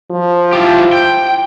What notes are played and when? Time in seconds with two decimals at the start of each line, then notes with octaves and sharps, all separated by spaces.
0.11 F3
0.53 E4 F4 G4
0.93 G5